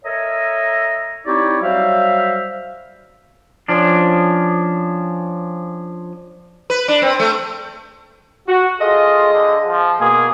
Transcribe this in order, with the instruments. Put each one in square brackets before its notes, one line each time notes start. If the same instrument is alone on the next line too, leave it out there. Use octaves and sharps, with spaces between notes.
[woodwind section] A4 A#4 C#5 D#5 E5 A#5
C4 D#4 E4 G4 C#5 D5
F#3 G3 F#4 C5 E5 F5
[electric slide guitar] F3 C#4 D4
[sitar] B4
D4
C4
A3
[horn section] F#4
[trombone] F4 [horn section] G#4 A4 D#5
[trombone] D3
F3
[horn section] B2 A#3 [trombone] G#4